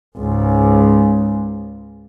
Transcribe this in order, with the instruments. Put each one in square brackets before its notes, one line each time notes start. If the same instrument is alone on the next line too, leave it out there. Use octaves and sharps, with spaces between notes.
[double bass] C#2 G#2